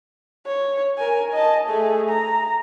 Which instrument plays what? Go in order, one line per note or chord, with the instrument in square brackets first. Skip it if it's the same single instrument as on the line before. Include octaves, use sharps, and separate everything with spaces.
[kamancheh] C#5
A#4 G#5
D#5 A5
A3 G#4
A#5